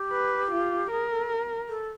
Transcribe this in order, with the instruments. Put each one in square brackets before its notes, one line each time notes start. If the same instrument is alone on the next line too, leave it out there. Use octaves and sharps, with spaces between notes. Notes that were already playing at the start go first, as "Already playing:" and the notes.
Already playing: [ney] G4
[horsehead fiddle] B4
F4
[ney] G#4 [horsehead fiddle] A#4
[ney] A4
A4